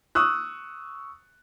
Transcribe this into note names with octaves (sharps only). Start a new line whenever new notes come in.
C#6 D#6 E6 F#6